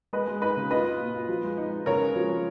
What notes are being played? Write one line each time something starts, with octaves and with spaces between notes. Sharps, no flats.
G#3 B4 D#5
G#3
D#4 B4 D#5
C#3
F4 B4 D#5
F4
A#2
F4
F3
G#3
D#4
D#4
C#3 A#4 C#5
G#3
F3
F3